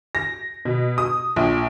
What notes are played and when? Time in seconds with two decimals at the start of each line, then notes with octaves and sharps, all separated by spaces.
0.15 A#6
0.65 B2
0.98 D#6
1.36 A#1